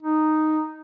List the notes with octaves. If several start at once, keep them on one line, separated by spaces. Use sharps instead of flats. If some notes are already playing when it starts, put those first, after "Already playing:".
D#4